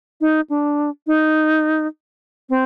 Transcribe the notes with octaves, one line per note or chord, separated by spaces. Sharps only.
D#4
D4
D#4
C4